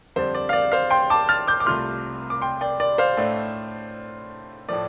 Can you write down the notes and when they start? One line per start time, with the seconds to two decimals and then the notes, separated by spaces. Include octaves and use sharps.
0.16 F2 D3 G3 D4 C5
0.35 D5
0.49 F5
0.53 D5
0.72 C5 F5
0.90 G5 C6
1.10 A5 D6
1.29 F6 A6
1.48 D6 G6
1.60 D6
1.66 C2 C3 A3 F4 C6 F6
2.30 D6
2.42 G5 C6
2.61 D5 G5
2.80 D5
2.98 C5 F5
3.17 A2 A3 D4
4.68 A2 F3 A3 D5